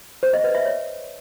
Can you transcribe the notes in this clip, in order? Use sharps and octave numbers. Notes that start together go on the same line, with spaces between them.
C5
D#5
B4
E5
C#5